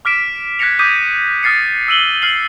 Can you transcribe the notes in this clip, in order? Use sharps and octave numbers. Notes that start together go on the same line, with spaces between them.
D6 F6 B6 D7 E7
F#6 G#6 A#6 B6 C#7 F7
D6 D#6 G6 G#6 B6 D#7
D#6 F6 A6 C7 C#7
E6 D#7 F#7 G7
F6 C7 F#7